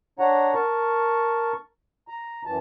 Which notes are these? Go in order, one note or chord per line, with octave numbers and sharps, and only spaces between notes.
D4 C#5 F#5 A#5
A#4 A5 C#6
A#5
F#2 E3 A5